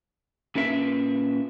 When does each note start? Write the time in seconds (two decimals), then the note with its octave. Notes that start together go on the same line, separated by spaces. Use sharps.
0.55 A#2 C#4 B4 E5